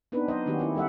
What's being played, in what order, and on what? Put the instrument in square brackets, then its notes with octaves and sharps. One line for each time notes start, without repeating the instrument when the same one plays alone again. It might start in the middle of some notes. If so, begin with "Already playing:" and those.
[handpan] B3 C4 D4 D#4 B4
F#3 C5 D#5
D#3 A#3 C4 C#4 F#4 G4
C4 E4
G3 A4 E5 F#5